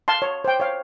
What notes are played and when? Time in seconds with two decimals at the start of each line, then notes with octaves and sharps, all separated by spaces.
0.08 F5 A5 C6
0.22 C#5
0.45 C5 G5
0.60 C#5 F5